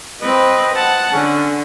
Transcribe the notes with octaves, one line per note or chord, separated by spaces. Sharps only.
C4 B4 D#5
F#5 A5
D3 C#4